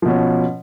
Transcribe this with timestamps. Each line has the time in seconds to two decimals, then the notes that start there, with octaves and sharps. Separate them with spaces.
0.02 F3
0.05 B2
0.08 C#4